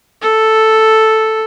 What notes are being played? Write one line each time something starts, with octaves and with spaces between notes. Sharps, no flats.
A4